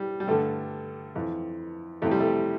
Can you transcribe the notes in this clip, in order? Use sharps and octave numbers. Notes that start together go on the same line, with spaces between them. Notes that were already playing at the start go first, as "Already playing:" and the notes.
Already playing: E3 G3
G3
G2 D3 A3
F2 E3
F2 C3 E3 A3
G3
A3